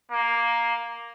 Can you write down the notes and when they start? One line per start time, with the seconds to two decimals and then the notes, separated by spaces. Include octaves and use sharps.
0.11 A#3